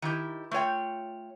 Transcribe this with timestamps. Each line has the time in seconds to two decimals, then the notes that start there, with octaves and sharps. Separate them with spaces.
0.02 D#3 E4 G4
0.52 A3 F4 C#5 G5